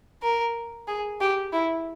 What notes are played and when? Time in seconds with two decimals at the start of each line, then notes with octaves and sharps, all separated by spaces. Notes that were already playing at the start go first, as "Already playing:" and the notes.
0.23 A#4
0.88 G#4
1.21 G4
1.53 E4